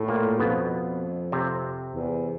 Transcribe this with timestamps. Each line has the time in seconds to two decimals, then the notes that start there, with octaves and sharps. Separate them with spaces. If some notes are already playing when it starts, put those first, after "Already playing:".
Already playing: A2
0.08 A#2 A#3
0.39 F2 B2 B3
1.32 C3 C4
1.95 E2